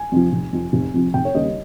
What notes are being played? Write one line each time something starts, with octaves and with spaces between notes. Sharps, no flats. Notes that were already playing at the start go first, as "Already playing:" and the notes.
Already playing: G#5
F2 C3 F3
F1
F2 C3 F3
F1
F2 C3 F3
F1 G5
C#5
D#2 C#3 G3 D#5